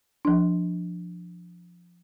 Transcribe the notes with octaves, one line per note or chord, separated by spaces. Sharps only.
F3 D4